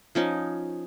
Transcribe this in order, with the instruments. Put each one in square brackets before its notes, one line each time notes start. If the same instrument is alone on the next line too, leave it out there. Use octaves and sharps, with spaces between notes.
[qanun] F3 C#4 D#4